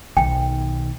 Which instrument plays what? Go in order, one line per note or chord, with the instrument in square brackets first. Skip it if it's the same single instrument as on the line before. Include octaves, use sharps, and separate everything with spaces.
[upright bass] B1 D#3 [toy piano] G5